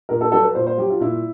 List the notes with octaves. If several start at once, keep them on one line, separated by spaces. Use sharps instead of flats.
A#2 A#4
A4
F#3 A4
B4
A#2 C5
C5
F#3 G4
F4
A#2 E4